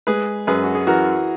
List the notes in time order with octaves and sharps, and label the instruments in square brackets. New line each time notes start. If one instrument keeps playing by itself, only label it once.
[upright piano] G#3 [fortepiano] G#4 B4
[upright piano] F#2 [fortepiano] G#4 B4
[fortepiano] F#4
G#4
[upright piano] E3 [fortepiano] F#4 A#4